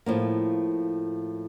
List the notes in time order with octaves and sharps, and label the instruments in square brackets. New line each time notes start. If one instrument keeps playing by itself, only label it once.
[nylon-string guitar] A2 F3 A#3